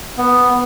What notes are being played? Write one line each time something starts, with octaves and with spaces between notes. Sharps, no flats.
B3